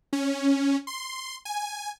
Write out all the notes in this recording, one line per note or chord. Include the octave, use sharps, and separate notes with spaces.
C#4
C6
G#5